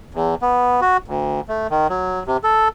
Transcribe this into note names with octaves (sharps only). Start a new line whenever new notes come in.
E2
B3
F#4
D2
A3
D#3
F#3
C3
A4